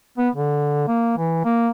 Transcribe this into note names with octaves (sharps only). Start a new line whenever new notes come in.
B3
D3
A#3
E3
A#3